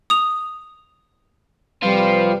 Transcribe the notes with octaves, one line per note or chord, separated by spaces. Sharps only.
D#6 F7
F2 C3 F3 G3 F4 B4